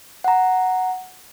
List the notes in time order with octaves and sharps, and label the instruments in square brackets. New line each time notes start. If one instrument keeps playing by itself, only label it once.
[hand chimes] F#5 A#5